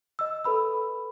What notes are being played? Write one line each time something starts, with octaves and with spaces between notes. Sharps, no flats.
D#5 E6
A4 B4 B5 E6